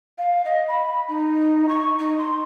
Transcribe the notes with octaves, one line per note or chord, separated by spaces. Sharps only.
F5
D#5
B5
D#4
C#6
D#4
C6